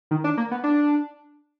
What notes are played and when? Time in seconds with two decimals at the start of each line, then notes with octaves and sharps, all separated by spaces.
0.11 D#3
0.24 D4
0.37 A#3
0.51 B3
0.64 D4